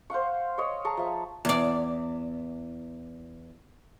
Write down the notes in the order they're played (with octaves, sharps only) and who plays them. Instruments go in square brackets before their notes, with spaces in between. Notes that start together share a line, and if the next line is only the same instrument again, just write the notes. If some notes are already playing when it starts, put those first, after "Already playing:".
[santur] C5 F5 F#5 C#6
C#5 D#5 C#6
G#4 A5 A#5 C#6
F3 E5
[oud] E2 D5